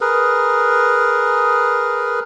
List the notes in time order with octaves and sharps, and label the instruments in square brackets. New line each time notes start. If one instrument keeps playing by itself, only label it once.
[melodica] G#4 A#4 B4